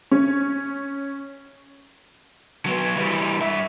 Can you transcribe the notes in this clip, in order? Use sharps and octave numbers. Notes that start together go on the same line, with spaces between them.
C#4
F#3 B3
E3 G3
G2 E5